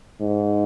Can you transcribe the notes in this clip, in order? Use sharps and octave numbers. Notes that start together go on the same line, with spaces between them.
G#2